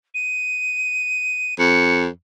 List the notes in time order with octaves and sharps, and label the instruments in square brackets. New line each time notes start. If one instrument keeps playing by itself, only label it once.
[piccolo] D#7
[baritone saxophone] F2 [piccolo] C#7